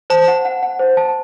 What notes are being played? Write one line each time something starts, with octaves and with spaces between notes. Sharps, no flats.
C5 A5
F#5
F#5
F#5
C5
A5